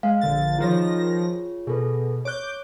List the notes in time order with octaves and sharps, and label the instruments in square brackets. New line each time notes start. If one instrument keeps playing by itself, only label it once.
[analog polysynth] G#3 [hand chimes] F5
[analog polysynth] A#1 D3 A6
[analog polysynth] D#3 F3 A#6 [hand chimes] F4 G#4 C#5
[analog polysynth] B2 [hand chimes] G#4 A4 B4
[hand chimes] C#5 F#6 [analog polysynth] D6 G6